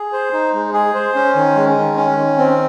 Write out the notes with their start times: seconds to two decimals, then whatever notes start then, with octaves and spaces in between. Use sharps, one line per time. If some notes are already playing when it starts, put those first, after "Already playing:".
Already playing: G#4
0.13 C5
0.33 D#4
0.54 G#3
0.73 G#4
0.95 C5
1.15 C#4
1.36 D#3
1.56 G#3
1.76 D#3
1.97 C#4
2.17 D#3
2.38 C4